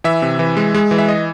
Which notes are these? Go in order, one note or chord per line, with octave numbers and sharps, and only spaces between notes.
E3 E5
C3
E3
G#3
G#3
E3
E5
D#5